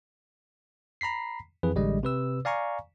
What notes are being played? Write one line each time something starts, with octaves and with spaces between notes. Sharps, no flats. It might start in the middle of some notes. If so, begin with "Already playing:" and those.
A#5 B5 B6 C7
F2 E3 G#4 B4
A1 D3 G3 G#3 D#5
C3 B4 E6
D5 F5 G#5 A#5 C#6